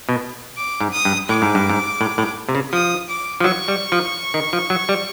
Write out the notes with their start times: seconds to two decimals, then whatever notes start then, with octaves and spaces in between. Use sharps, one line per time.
0.09 B2
0.57 D6
0.80 G#2
0.92 D#6
1.05 G2
1.29 A2 D6
1.42 G#2
1.55 G2
1.70 G#2
2.01 A2
2.18 A2
2.49 C3
2.55 C#3
2.72 F3 D#6
3.09 D6
3.40 F3
3.44 F#3 C#6
3.68 G3
3.92 F3
4.34 D#3
4.53 F3
4.70 F#3
4.89 G3